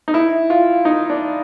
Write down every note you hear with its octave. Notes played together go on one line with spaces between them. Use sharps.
D#4
E4
F4
D#4
D4